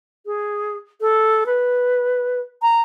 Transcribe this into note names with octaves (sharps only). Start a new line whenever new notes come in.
G#4
A4
B4
A#5